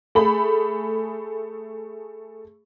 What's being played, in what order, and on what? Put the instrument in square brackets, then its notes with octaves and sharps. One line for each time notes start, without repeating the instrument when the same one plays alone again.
[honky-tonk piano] A3 G#4 B5